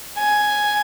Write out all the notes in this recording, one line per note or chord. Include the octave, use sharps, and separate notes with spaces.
G#5